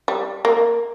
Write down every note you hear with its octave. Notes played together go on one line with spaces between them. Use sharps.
G3
A#3